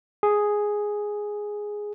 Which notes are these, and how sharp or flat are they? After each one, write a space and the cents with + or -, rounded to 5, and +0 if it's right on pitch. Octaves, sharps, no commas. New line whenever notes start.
G#4 +0